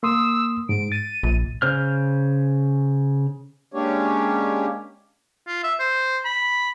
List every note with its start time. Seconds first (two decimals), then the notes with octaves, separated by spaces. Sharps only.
0.03 A#3 C6 D#6 E6
0.69 G#2 D7
0.92 A6 D#7
1.23 A#1
1.62 C#3 C5 F6
3.73 G#3 A#3 C#4 D4 G4 C#5
5.47 F4
5.64 E5
5.80 C5
6.25 B5